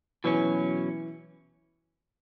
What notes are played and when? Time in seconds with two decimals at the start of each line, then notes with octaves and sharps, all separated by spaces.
0.24 B2 E3 F#3 C#4